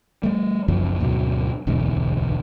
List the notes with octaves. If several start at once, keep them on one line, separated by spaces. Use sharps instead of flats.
G3 A3
F#1 C2 F#2 F3
D2 G#2 B2 F#3
D1 B1 E2 G#2